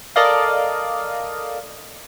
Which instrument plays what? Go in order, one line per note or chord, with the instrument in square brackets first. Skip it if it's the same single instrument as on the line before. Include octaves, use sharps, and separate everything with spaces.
[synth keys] A4 A#4 D5 D#5 F5